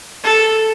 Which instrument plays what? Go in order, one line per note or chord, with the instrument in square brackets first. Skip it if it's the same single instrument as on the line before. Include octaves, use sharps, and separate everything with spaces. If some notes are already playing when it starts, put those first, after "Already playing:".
[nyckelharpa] A4